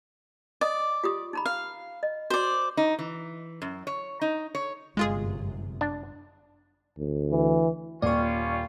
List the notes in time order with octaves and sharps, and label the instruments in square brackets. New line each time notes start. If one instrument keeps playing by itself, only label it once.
[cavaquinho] D5 [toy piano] D#5 D#6
[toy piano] F4 G4 D#6
D#4 A#5 B5
[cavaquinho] F5
[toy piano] D#5
[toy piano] F#4 [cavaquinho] C5 D5
[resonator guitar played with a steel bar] D#4
E3
F#2
C#5
D#4
C#5
[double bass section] G1 F#2 C3 [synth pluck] G#3 F4 G#4
[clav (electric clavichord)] D4
[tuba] D2
[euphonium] E3
[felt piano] D#1 [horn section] G3 C#4 F4 [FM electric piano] D5 C#6